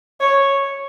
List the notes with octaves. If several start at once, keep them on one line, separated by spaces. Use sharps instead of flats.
C#5